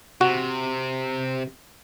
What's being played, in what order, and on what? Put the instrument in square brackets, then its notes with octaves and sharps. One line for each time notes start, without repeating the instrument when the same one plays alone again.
[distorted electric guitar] C3 [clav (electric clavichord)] F#4